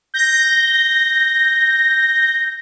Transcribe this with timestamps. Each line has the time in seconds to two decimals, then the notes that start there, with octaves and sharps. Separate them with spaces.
0.14 G6 A#6